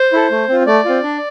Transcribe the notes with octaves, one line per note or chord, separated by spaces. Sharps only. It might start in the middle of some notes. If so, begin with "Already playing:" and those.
Already playing: C5
E4 A4
A3
C4 F4
A3 D5
C4 F4
D4